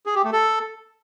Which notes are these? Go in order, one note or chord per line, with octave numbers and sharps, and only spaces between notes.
G#4
G4
A3
A4